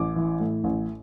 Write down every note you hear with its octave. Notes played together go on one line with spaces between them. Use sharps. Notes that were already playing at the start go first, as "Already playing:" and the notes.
Already playing: A1 D6
E3
A2
A1